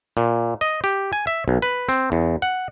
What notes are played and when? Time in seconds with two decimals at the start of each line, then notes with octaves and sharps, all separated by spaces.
0.17 A#2
0.61 D#5
0.84 G4
1.13 G#5
1.27 E5
1.48 B1
1.62 B4
1.89 C4
2.12 E2
2.42 F#5